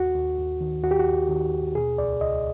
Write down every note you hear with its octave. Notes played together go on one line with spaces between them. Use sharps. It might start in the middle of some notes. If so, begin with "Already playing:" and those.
Already playing: D#2 F#4
D#2
D#2
D#3
D#2 F#4
G4
F#4
D#2
D#3
D#2
B2 G#4
C#2 D5
C#2 D#5